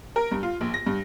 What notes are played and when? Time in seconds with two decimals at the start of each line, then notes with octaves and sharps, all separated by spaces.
0.16 A#4
0.31 G2
0.43 F4
0.61 A#1
0.74 A#6
0.86 G2